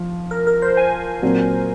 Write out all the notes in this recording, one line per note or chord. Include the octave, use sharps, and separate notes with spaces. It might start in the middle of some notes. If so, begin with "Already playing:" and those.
Already playing: F3
A#4
A#4
C5
G#5
A#2 F#3 C4